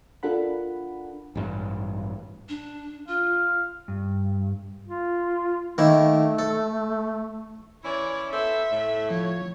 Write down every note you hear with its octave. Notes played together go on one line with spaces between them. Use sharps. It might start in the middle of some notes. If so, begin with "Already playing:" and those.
D4 F4 A4 A#4 F#5 B5
A1 G2
D4
F4 F5
G2
F4
D#3 A3 A#3 E4
A4
E3 C#4 E4 C#5 D5
B3 A4 C5 E5
A2
F3 C#5